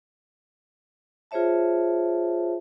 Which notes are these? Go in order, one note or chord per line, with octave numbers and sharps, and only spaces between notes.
F4 G#4 C5 C#5 E5 A5